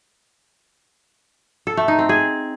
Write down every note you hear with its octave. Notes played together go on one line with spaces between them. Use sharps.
A4
A3
D#4
C4
G#4